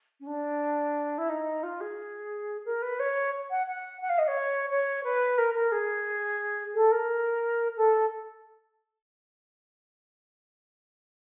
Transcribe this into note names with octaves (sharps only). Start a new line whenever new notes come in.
C#4
D4
E4
D#4
F4
G#4
A#4
B4
C#5
F#5
F#5
F#5
F5
D#5
C#5
C#5
B4
A#4
A#4
G#4
A4
A#4
A4